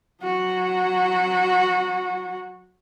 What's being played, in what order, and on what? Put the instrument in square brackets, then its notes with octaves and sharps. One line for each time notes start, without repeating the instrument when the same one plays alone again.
[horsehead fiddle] F#3 F#4